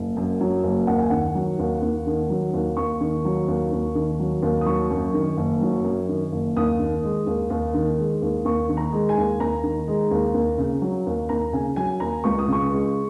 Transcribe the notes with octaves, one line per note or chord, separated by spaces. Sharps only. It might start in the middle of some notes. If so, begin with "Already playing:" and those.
Already playing: F#1
F#2
F#3
F#1
D#2 F#5
G#5
D#3 F#5
F#3
D#2
D#2
D#3
F#3
D#2
D#2 C#6
D#3
F#3
D#2
D#2
D#3
F#3
D#2
D#6
F#3 C#6
F#2
D#3
F#1
F#3
F#2
D#3
F#1
D#2 D#6
D#3
G#3
D#2
D#2
D#3
G#3
D#2
D#2 C#6
D#3
A#5
G#3
G#5
D#2
D#2 A#5
D#3
G#3
D#2
D#2
C#3
F#3
D#2
D#2 A#5
C#3 G#5
F#3 G#5
D#2 A#5
C#2 C#6
D#6
C#3 C#6
G#3